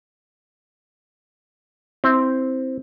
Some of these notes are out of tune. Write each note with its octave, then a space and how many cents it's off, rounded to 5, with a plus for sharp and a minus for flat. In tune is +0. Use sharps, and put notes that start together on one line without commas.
C4 +0 E4 -20